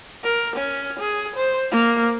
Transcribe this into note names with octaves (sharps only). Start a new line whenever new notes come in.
A#4
C#4
G#4
C5
A#3